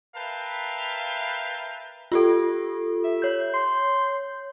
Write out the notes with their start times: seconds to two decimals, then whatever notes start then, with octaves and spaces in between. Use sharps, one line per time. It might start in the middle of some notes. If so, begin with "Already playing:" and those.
0.16 A#4 B4 E5 F5 G5 A5
2.12 F4 G4 A4
3.04 E5
3.22 C#5 G6
3.54 C6